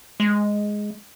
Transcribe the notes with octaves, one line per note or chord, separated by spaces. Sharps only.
G#3